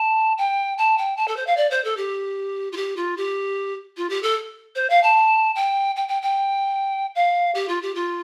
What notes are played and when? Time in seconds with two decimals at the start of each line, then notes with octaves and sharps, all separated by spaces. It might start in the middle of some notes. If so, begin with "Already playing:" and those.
Already playing: A5
0.38 G5
0.78 A5
0.98 G5
1.17 A5
1.28 A4
1.37 C5
1.47 F5
1.57 D5
1.71 C5
1.84 A4
1.97 G4
2.72 F4
2.77 G4
2.97 F4
3.17 G4
3.97 F4
4.10 G4
4.23 A4
4.76 C5
4.90 F5
5.03 A5
5.56 G5
5.96 G5
6.09 G5
6.22 G5
7.15 F5
7.55 G4
7.69 F4
7.82 G4
7.95 F4